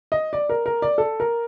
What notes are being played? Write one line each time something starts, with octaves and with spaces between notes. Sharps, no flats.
D#5
D5
A#4
A#4
D5
A4
A#4